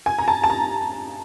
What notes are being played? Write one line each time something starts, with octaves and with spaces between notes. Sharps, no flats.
G#5
A#5
A5
A5
A#5